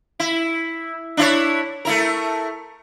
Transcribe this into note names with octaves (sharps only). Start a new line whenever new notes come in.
E4
D4 E4 C#5
A3 E4 A#4